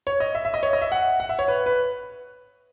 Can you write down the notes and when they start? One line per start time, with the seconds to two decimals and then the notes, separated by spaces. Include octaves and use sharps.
0.07 C#5
0.20 D#5
0.35 E5
0.45 E5
0.54 D#5
0.63 C#5
0.73 D#5
0.82 E5
0.92 F#5
1.20 F#5
1.29 E5
1.39 C#5
1.48 B4
1.66 B4